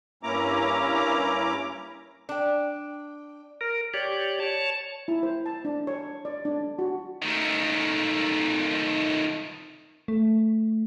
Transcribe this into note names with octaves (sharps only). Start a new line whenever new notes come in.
G2 A#3 C#4 E4 A#5 D6
D4 G5
A#4
G4 C#5 D5
C#5 A5
E4
C5
A5
D4
C#5
D5
D4
F#4
D#3 A3
A3